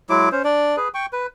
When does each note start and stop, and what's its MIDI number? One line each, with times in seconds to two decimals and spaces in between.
0.10 0.29 54
0.10 0.29 56
0.10 0.29 64
0.10 0.29 86
0.32 0.42 61
0.32 0.42 72
0.44 0.76 62
0.44 0.76 74
0.77 0.88 68
0.77 0.88 71
0.94 1.06 79
0.94 1.06 85
1.13 1.26 71